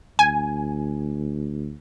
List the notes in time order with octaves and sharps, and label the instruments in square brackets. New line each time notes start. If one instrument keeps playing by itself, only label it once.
[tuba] D2 [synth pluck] G#5